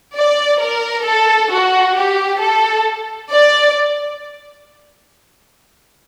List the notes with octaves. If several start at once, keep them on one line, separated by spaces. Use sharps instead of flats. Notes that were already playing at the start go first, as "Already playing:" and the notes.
D5
A#4
A4
F#4
G4
A4
D5